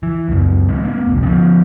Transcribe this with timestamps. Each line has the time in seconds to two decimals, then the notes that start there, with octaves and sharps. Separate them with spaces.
0.03 E3
0.28 C#2 F#2
0.69 E3 G#3 C4
0.84 A3 B3
1.07 F1 C2
1.23 F3 F#3 B3 C#4